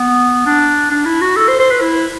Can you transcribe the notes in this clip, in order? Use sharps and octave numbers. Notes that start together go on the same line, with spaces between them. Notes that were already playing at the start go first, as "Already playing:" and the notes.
Already playing: B3
D4
D4
E4
F#4
A4
C5
C5
B4
E4